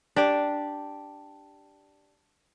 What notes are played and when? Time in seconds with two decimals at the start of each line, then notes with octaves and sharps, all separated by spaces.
0.16 D4 G4 D5